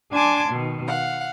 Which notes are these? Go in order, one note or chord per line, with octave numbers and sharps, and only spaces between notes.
D4 G#5 A5 C6 D6 G#6
B2 D#3
F5 F#5